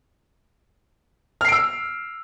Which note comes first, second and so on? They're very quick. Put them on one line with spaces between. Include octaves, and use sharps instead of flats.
F6 C7 D7 E6